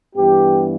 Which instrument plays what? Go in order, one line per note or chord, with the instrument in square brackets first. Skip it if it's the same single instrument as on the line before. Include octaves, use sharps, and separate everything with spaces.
[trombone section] G2 E3 B3 G4